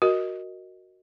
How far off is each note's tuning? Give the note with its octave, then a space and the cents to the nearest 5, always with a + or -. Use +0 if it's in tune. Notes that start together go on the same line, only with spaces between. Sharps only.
F#4 +0 A#4 +0 D#5 +0